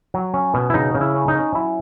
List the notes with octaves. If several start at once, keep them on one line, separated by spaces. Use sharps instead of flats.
F#3
C#4
B2
E4
C#3 D#4
C#3
E4
C#4
D#4
C#4
F#3 E4